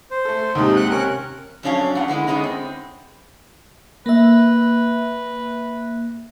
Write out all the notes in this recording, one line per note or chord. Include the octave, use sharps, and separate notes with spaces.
C5
A3 A4
D#2 G#2 C3 D#4
F#5 F#6
C3 C#4 A#4 F#6 C#7
F2 F#3 C#4 D4 C#5 F5
E2 C#4 F#5
D3 G#3 B3 E4
D3 G#3 B3 C#4 D#4
C4
A#3 B4 E5